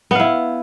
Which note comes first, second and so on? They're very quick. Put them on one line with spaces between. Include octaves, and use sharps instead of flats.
B3 F5 E4